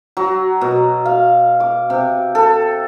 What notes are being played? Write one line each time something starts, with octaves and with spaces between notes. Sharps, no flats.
F#3
B2
F5
D6
C3
A4